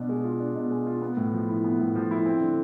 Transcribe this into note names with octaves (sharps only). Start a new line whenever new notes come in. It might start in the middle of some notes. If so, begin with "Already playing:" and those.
Already playing: B2 D4
G#3
F4
D4
B2
G#3
F4
B3
A2
F3
E4
B3
A2
F3
E4
C4
D3